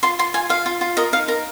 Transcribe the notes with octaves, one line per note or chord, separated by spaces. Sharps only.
F4 C6
F4 C6
F4 G#5
F4 F5
F4
F4
A#4 D#5
D#4 F5
A#4 A#5